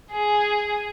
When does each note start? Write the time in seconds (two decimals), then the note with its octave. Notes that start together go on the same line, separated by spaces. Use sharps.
0.12 G#4